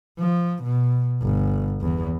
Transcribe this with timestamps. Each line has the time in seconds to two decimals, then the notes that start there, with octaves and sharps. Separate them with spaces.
0.19 F3
0.63 B2
1.22 G1
1.81 E2